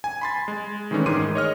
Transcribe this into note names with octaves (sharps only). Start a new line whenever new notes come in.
G#5
B5 C6 A6
G#3
D#3 E3 G#3 A3 C#4 D4
G#2 D#3 G#4 C6 D6 D#7
C#5 D#5 F6